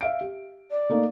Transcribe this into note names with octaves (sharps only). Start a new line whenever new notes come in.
E5 F5 D7
G4
D5
A3 A#3 D#4